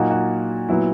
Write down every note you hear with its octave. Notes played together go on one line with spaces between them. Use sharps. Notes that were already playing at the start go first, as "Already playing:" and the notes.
Already playing: A#2 F#3 A#3 D#4 F#4
F#4
A#2 F#3 B3 E4